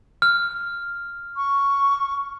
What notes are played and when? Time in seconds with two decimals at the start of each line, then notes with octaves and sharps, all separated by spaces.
0.22 F6
1.37 C#6